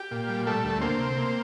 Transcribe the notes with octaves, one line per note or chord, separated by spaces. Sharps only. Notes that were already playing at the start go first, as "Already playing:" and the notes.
Already playing: G4
A#2
G3
G3 A3 A4
D2
A#3 C4 C5
C3
A#3